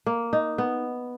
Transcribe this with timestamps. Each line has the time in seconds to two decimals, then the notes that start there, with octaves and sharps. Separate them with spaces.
0.07 A#3
0.33 D#4
0.58 B3